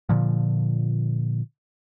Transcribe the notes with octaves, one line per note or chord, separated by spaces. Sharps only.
A#2 D3 F3